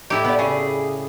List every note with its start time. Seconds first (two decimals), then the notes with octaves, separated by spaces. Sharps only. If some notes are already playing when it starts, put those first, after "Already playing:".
0.10 A2 D#4 E4 G4
0.25 B3 D5
0.39 C#3 G#4